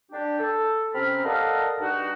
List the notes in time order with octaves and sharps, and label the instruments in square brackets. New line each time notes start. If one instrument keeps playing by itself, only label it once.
[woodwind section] D4 G4
A4
C3 C4 C#4 A#4 B5 F6
A4 A#4 D5 D#5 F5 F#5
G2 D#4 F#4